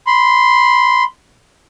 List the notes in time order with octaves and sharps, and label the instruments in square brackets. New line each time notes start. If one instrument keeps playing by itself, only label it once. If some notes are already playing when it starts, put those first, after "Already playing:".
[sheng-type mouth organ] B5 C6